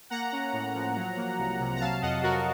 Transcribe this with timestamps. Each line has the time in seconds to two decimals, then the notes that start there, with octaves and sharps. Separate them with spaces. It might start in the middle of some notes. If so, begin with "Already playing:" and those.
0.10 A#3 F#5 A#5
0.32 C#4
0.53 A2
0.75 F3
0.96 F#3
1.16 A#3
1.38 C2
1.60 C3
1.76 A#5
1.80 F#3 F5 A5
2.02 F2 D#5 F#5
2.23 F2 F#4 A#4